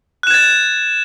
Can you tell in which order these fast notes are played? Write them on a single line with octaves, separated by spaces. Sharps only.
F#6 E7 G#6 A6